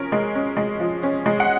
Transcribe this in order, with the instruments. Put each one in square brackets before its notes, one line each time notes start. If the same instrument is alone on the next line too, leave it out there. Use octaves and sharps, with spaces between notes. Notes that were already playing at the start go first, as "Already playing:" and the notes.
Already playing: [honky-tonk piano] F3 C#4 A#4
G#3
C#4
G#3
F3
C#4
G#3
F#5